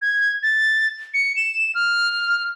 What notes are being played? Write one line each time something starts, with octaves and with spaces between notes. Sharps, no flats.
G#6
A6
C#7
E7
F6